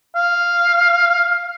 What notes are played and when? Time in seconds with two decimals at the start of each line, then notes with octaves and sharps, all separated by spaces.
0.16 F5